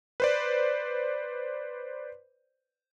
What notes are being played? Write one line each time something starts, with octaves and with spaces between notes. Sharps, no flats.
B4 C5 D5